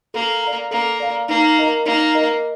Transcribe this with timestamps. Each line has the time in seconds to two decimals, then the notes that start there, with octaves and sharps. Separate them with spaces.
0.14 A#3 A4
0.43 D5 F5 A#5
0.71 A#3 A4
1.00 D5 F5 A#5
1.29 A#3 D#4
1.58 A#4 D#5 A#5
1.86 A#3 D#4
2.14 A#4 D#5 A#5